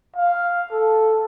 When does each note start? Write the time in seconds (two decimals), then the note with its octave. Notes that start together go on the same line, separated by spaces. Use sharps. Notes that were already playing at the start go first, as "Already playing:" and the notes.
0.16 F5
0.72 A4